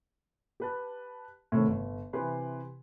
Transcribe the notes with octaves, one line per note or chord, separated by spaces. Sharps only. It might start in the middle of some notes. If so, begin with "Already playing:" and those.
G4 B4 A5
A2 C3 D#3 A3 C4
G1
C3 E3 G4 B4 C6